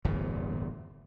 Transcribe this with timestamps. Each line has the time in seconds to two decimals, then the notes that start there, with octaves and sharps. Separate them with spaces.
0.04 D1 G1 E2 A#2